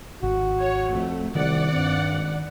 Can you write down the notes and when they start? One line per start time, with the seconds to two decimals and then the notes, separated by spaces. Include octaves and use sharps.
0.23 G#1 F#4
0.62 C#5
0.92 F2 A3
1.35 C2 D#3 D5 F#5
1.73 G2 C4
2.11 G#1